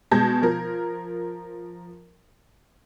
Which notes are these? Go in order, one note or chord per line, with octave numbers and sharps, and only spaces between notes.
B2 G#3 A5 G6 G#6 A#6
F3 A#4